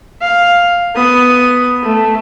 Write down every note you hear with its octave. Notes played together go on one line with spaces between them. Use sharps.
F5
B3 D#6
A3